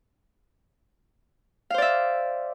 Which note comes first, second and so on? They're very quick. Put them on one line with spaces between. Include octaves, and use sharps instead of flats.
F5 C5 D5 E5